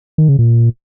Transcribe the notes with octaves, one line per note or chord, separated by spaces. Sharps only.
D#3
C#3
A#2